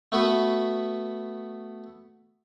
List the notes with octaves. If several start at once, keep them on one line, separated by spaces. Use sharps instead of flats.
A3 B3 F#4 B4